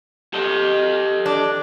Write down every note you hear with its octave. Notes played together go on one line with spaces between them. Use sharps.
G4 A4 D#5
D4